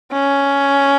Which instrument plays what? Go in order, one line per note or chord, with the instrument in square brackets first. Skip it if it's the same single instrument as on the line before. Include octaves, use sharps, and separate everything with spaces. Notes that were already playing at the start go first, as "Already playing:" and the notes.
[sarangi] C#4